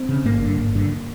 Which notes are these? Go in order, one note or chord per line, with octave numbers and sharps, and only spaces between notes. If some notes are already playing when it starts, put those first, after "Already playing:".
Already playing: C4
C#3
G#1 A#3
G2 D3
G#1
G2 D3